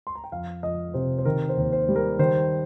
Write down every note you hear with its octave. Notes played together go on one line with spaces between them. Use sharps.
C6
A#5
G5
F2 F5
F2 D#5
C3 C5
C5
D#3 A#4
C5
D#2
C5
G3
A#4
D#3 C5